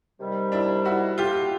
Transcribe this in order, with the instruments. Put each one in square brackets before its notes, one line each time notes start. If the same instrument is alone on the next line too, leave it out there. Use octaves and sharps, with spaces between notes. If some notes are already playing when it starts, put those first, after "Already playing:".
[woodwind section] C3 D#3 G3
[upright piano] D4 E4
E4 F#4
F4 G4